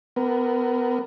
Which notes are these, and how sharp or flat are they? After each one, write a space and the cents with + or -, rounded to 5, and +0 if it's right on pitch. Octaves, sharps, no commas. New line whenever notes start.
B3 +25 A#4 +0